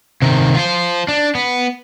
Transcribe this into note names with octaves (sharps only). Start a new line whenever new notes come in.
C3 D#3
F4 C5
D4
B3